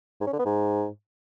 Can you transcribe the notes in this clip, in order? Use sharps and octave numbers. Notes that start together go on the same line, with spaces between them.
G#2
C#4
D3
B3
G#2